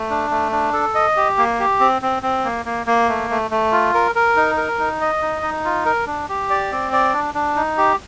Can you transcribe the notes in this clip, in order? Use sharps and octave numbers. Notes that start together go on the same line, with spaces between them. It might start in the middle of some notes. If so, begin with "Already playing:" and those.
Already playing: A3
D4
A3
D4
A4
D#5
G4
A#3
G4
C4
C4
C4
A#3
A#3
A#3
A3
A3
A3
F4
A#4
A#4
D#4
A#4
D#4
D#5
D#4
D#4
F4
A#4
D4
G4
D5
C4
D5
D4
D4
D#4
G4